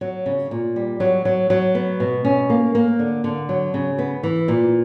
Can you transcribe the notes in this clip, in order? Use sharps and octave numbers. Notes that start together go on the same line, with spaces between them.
F#3
C#3
A#2
G3
F#3
F#3
F#3
B3
B2
C#4
A#3
A#3
D3
D3
F#3
C#3
B3
E3
A#2